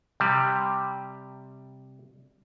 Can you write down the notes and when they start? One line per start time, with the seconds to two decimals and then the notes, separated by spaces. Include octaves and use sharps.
0.20 C3 G3